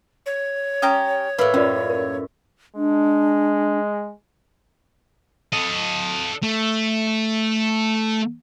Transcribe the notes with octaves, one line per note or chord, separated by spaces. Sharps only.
C#5
C#4 G4 A#5 D#6
A2 A#3 E4 B4
F#2 C#4 F4 D5
A#4
G#3 D4
A4 D#5
A3